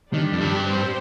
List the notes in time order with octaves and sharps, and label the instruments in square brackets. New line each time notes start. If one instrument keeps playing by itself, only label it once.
[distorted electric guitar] D#3 [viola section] G3 D4 G4
[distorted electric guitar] F2
G2
[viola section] C4 G4 C5